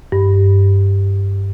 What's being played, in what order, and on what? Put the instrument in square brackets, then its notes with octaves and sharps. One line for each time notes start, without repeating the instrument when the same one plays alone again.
[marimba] G2